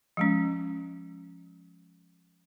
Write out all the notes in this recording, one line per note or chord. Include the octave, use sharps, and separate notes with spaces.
F3 G#3 C#4